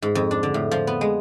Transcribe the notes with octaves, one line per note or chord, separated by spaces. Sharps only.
G#2
F2
D4
D3
A2
F3
B3
G#3